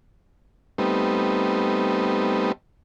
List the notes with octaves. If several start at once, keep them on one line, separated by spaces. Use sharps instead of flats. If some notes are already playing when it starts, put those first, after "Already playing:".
G3 A3 B3 C4 D#4